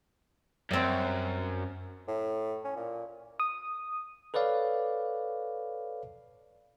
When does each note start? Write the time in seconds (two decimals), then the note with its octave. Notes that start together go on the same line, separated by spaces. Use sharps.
0.71 F#2 G3 C4
2.08 A2
2.65 C#4
2.76 A#2
3.40 D#6
4.34 A4 B4 C#5 D5 F5